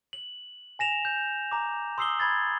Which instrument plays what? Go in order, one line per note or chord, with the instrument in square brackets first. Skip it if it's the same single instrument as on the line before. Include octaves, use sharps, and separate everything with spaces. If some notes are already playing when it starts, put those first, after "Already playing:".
[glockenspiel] F#7
G#5 A#6 E7 F7
G6
A#5 D6
C6 D#6 E6 C7 F#7 G7
B5 G#6 A6 C7